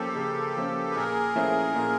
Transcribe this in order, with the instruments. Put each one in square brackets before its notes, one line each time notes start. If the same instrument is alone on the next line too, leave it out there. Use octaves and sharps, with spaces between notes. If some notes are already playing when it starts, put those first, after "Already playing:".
Already playing: [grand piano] F3 A#3 C#4 [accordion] G4 A4
[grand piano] C#3
F3 A#3 C#4
[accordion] B4
[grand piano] A#2 [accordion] G#4 A#4
[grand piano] F3 A3 C#4 E4
A#2